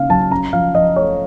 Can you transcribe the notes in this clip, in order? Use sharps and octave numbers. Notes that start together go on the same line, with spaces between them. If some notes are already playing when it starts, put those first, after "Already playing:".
Already playing: C#3 A#3 D#4 F5
F#3 A5
C#4 A#5
F3 F5
F3 D#5
A3 C#5